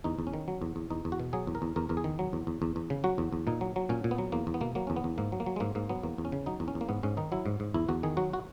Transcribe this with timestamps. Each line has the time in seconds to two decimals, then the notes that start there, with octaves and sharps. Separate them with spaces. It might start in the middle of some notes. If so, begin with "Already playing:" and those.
0.04 E2 D#4
0.19 E2
0.27 C#4
0.33 D#3
0.48 F#3
0.62 E2
0.76 E2
0.90 E2 D#4
1.05 E2
1.12 F#4
1.19 B2
1.33 F#3 G#4
1.47 E2
1.55 A#4
1.62 E2
1.76 E2 A#4
1.89 E2 A#4
1.97 G#4
2.04 D#3
2.19 F#3
2.33 E2
2.47 E2
2.62 E2
2.76 E2
2.90 C#3
3.04 F#3 F#4
3.18 E2
3.33 E2
3.47 A#2 D#4
3.61 F#3
3.76 F#3
3.89 A#2 C#4
4.04 A#2
4.11 B3
4.18 F#3
4.32 E2 A#3
4.47 E2
4.54 B3
4.61 B2 A#3
4.75 F#3 A#3
4.87 E2 C#4
4.96 B3
5.04 E2
5.18 G#2 A#3
5.32 F#3
5.40 A#3
5.46 F#3
5.56 G#3
5.60 G#2 A#3
5.75 G#2 A#3
5.89 F#3 B3
6.03 E2 A#3
6.18 E2
6.25 C#4
6.32 C#3
6.46 F#3 D#4
6.60 E2
6.68 C#4
6.75 E2
6.81 A#3
6.89 G#2 B3
7.03 G#2 C#4
7.17 D#3 D#4
7.32 F#3 E4
7.46 G#2
7.60 G#2
7.74 E2 E4
7.89 E2 F#4
8.03 D#3 G#4
8.17 F#3 F#4
8.33 F#4